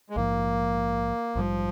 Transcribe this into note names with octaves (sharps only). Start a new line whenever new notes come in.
G#3
A#1 G#2 F3 A#3
A#1 G#2 F3 G3